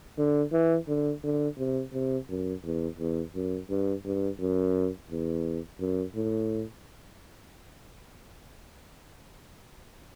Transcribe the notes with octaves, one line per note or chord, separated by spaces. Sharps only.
D3
E3
D3
D3
C3
C3
F#2
E2
E2
F#2
G2
G2
F#2
E2
F#2
A2